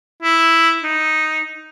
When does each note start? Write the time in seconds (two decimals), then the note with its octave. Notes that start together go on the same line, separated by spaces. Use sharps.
0.22 E4
0.83 D#4